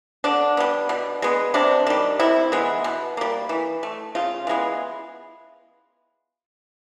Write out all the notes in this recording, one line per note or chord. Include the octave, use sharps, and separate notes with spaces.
D3 D4
G3 B3
B2
G#3 B3
C3 D4
D#3 G3
C3 E4
E3 G#3 B3
B2
G3 A#3
E3
A3
C#3 F4
E3 G#3 B3